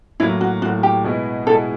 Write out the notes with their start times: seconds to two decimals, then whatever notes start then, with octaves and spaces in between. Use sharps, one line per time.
0.20 A2 F#3 A#3 E4
0.41 F#4
0.62 A2 F#3 A#3 F#4
0.83 G4
1.04 B2 G#3 B3 E4 G#4
1.47 B2 G#3 B3 E4 G#4 A4